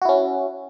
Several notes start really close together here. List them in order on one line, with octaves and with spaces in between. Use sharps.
F#4 E4 C#4